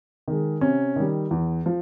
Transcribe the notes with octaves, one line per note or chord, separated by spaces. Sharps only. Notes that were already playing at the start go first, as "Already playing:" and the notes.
D#3 G#3
C3 C#4
D#3 G3
E2
F3